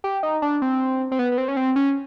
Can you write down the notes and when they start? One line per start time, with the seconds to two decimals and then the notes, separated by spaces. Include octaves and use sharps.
0.04 G4
0.23 D#4
0.42 D4
0.62 C4
1.12 C4
1.19 B3
1.32 B3
1.38 C4
1.48 C#4
1.57 C4
1.76 C#4